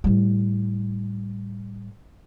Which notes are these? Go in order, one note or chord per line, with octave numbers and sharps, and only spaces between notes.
A2 G3